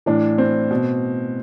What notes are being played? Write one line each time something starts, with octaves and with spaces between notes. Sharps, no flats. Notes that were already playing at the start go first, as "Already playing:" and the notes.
A2 E3 D4
C4
B2